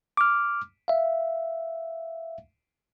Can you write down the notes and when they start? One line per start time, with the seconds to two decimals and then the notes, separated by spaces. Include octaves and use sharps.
0.17 D6 F6
0.88 E5 F5